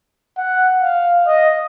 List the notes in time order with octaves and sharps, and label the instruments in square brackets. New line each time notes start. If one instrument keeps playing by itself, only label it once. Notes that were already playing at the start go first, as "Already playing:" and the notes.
[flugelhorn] F#5
F5
D#5